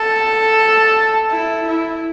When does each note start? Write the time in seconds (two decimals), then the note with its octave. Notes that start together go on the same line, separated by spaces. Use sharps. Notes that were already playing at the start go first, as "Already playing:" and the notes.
Already playing: A4
1.31 E4
1.67 E4